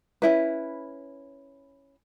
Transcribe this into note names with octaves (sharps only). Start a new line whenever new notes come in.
C#4 E4 B4